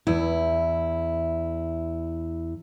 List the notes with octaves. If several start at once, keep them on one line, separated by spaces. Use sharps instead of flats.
E2 E4